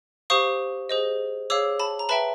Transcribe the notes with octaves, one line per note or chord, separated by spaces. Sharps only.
G4 C5 F5 C#6 D#6
G#4 C5 D#5
G#4 C#5 F5 D6 E6
A5 B5
A#5
B4 E5 G5 A5 B5